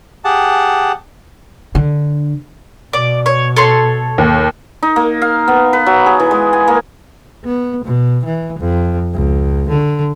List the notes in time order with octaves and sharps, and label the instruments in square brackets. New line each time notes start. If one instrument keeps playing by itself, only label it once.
[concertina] G4 G#4 F#5 A5
[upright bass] D3
[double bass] B2 [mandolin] D5
[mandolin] C#5
A4 C#5 C6
[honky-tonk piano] D#2
[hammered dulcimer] D#4
A#3
F5
B3
B4
F#3
G#4
E3
G#3
G#5
A#3
[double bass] B3
B2
E3
F2
C#2
D3